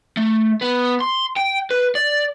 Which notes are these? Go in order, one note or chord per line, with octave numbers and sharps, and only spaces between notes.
A3
B3
C6
G5
B4
D5